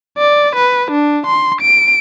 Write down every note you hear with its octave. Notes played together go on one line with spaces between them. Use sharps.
D5
B4
D4
C6
D7